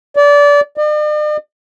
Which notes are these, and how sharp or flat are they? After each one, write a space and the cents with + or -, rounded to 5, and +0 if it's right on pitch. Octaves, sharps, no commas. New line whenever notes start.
D5 -25
D5 +45